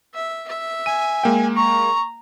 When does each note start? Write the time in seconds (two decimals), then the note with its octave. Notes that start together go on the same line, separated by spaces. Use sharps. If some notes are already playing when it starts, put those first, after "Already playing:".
0.15 E5
0.48 E5
0.86 G#5 D#7
1.24 G#3 A#3 G5
1.56 A#5 C#6